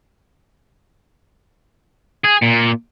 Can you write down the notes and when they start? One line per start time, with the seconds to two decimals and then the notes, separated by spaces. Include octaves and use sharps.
2.25 G#4
2.43 A#2